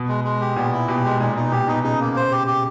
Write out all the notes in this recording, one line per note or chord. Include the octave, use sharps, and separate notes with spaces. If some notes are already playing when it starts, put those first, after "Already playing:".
Already playing: B2
G#3
G#3
G4
A#2 B3
E4
B2 G4
G#3
A#2 D#4
B2 D#4
A#2 G4
B2 D#4
C#3 D#4
A#3
C5
G4
G4